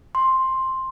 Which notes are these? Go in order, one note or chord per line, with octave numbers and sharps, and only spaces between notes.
C6